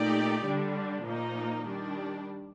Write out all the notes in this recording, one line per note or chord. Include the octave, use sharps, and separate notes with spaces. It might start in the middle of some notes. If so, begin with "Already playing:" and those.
Already playing: A#2 A3 D#4 G4 D5
D3 G3 D4
A#2 F3 A#3 D#4
D#3 G3 D4